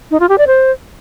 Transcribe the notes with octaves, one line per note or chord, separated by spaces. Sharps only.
D#4
F4
G4
D5
C5